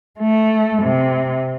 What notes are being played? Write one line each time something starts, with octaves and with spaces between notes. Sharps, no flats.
A3
C3